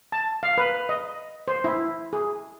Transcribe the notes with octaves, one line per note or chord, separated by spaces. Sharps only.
A5
F5
B4
D#5
C5
E4
G#4